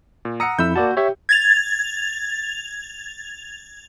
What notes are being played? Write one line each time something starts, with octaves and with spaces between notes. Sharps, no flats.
A#2
F#5 A#5 D#6 E6 C#7
F2 E4 B5 E6 G6
A#3 F#4 D5 A5
G4 C#5 E5
G#6 A6 F7